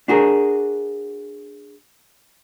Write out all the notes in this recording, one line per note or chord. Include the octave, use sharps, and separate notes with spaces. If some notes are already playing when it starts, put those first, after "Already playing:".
D4 F#4 G#4 A#4